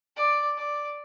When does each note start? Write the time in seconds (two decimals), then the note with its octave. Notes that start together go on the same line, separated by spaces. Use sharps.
0.16 D5
0.58 D5